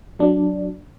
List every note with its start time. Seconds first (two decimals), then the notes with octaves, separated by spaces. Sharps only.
0.19 F#3 D4